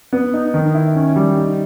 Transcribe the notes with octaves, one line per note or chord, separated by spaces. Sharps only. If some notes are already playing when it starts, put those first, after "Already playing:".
B3
D#4
D#3
E4
C#4
G3
D#4